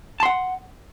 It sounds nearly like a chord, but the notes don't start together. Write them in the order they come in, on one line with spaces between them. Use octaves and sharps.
A5 C6 F#5